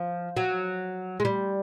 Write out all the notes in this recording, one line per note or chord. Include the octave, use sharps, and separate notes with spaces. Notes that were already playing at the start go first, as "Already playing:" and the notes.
Already playing: F3
F#3
G#3
G3